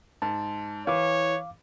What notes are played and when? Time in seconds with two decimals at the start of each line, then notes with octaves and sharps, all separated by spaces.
0.22 G#2 A5
0.87 E3 C#5 F5 D6